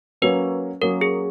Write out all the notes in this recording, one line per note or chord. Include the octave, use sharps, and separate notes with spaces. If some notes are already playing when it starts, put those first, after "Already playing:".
F#3 A#3 C#4 F#4 B4 C#5
F#3 A#3 C#4 F#4 A#4 C#5
G#4